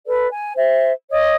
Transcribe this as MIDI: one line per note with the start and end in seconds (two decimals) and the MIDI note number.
0.06 0.28 69
0.06 0.28 71
0.06 0.28 74
0.30 0.52 80
0.56 0.91 72
0.56 0.91 76
1.11 1.36 73
1.11 1.36 75
1.11 1.36 87